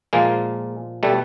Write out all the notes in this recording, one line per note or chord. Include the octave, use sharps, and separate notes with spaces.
A#2 F3 G#3 A#3
B2 G3 A3